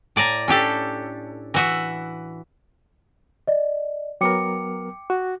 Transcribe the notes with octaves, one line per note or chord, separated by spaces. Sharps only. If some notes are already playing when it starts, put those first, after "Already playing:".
A2 D5 G#5 A#5
C#4 D4 G4 A4
E3 F#4 E5
D5 D#5
F#3 B3 A#4 G5 D6 C#7
F#4